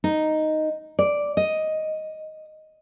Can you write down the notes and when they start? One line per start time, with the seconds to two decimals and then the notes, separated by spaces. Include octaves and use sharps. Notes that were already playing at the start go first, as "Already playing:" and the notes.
0.04 D#4
0.99 D5
1.37 D#5